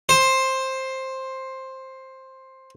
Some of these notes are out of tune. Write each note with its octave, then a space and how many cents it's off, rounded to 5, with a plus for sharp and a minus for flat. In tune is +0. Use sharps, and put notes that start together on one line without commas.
C5 +10